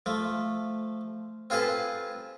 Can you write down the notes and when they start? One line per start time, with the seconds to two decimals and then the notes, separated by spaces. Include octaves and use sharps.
0.06 F3 A3
1.50 C4 F4 G#4 A4 B4 A5